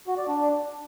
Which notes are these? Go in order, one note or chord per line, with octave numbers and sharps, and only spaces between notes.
F#4
D5
D4